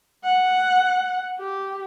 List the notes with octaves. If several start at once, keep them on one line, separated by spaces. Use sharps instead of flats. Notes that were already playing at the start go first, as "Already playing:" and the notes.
F#5
G4